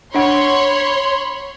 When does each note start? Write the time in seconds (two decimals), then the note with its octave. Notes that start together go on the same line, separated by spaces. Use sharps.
0.14 D4 C#5 F#5 B5 C6